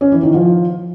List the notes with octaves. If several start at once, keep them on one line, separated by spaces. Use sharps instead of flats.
C#4
E3
D#3
F3